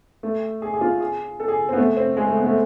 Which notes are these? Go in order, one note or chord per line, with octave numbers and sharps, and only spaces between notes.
A3
G#4
G#4
F4
G#4
A4
G#4
B3 C4
A3
C4
G#3
A3
B3
A3